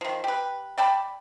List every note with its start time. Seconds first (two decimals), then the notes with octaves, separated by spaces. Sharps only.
0.01 D#3 F3
0.24 G4 B4
0.78 D5 G5 A5 B5